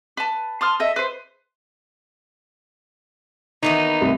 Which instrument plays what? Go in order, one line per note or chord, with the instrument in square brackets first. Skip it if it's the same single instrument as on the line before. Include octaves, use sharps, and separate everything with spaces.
[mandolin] B4 A5
A5 C6 D#6 F6
A4 D#5 E5
B4 C5
[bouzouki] D#3 E3 B3 [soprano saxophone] D#4
[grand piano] C2 A3